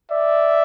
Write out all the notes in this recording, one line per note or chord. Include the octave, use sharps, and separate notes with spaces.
D5 E5